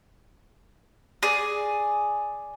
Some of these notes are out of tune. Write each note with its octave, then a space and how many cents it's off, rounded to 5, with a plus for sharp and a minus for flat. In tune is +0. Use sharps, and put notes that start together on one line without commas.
G#4 +0 D5 +0